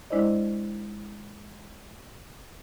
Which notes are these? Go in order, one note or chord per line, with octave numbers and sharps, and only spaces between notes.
G#3 D4 E4 C5 D5 D#5